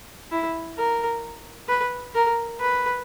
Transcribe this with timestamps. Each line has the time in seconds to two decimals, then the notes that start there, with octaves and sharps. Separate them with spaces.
0.31 E4
0.78 A#4
1.69 B4
2.15 A#4
2.60 B4